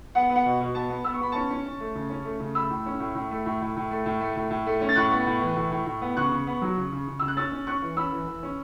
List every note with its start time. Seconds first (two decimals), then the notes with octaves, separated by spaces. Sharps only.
0.15 B3 F#5
0.30 B3
0.35 F#5
0.45 B2
0.61 B2
0.75 B3 A5
0.90 B3
1.05 B3 E6
1.14 C#6
1.20 B3 B5
1.32 C#4 A5 C#6
1.51 C#4
1.66 C#4
1.80 A3
1.95 C#3
2.10 C#4
2.25 A3
2.40 C#3
2.55 A3 B5 E6
2.70 A2
2.86 C#4
3.00 A2
3.15 A2
3.31 A3
3.46 A2
3.62 A2
3.77 A2
3.91 A3
4.06 A2
4.21 A3
4.36 A2
4.51 A2
4.66 A3
4.81 C#4
4.89 A6
4.96 A2 C#6 F#6
5.11 B3
5.27 A2
5.41 E3
5.56 A2
5.72 A2
5.86 A2
6.02 B3
6.17 C#3 C#6 F#6
6.31 C#3
6.47 B3
6.62 F#3
6.77 C#3
6.92 C#3
7.08 C#3
7.20 C#3 E6
7.28 F#6
7.37 C#4 E6 A6
7.52 C#4
7.67 C#4 C#6 F#6
7.82 E3
7.97 C#4 B5 E6
8.12 E3
8.28 E3
8.43 C#4